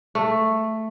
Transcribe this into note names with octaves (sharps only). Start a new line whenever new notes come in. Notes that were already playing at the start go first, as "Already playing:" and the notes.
A3